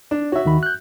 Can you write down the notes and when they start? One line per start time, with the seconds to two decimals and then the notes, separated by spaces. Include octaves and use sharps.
0.11 D4
0.32 F#4 C#5 E5
0.45 D#2 D#3 B5
0.63 F#6 G6